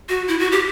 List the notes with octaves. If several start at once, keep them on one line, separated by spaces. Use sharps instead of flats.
F#4
E4
F#4
G4